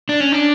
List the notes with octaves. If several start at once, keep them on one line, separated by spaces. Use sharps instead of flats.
D4
C#4
D4